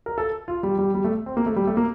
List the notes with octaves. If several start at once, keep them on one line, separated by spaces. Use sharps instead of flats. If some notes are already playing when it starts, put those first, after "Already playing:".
A#4
A4
F4
G3
G3
G3
A3
C4
A#3
A3
G3
A3
A#3